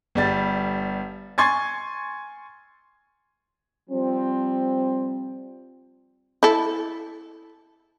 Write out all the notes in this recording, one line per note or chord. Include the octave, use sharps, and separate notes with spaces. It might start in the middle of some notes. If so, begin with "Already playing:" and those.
G1 G3 A6
G#5 C6 C#6 G#6 A6
F3 G3 C4
E4 A4